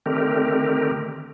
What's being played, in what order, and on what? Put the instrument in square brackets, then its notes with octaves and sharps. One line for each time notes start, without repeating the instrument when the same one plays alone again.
[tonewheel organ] D3 D#3 A3 C4 G4 A#4